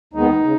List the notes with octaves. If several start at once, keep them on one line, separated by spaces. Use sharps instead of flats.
D#2 D#3 G#3 B3 D#4
C#3